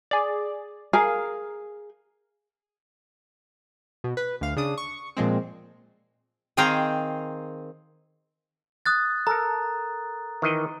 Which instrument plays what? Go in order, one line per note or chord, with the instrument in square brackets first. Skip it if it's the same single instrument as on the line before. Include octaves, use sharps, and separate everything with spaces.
[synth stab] G#4 D5
[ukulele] G#4 [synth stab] A#4 F5
[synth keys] B2
B4
D2 F5
C#3 D4 D#6
C#6
A#2 F3 G#3 C4
[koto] D#3 C4 G#4 F5 G5 A#5
[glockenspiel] D#6 F#6 A6
[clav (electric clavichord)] A4 A#4 [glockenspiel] A#5
[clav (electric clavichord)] D#3 E3 D#5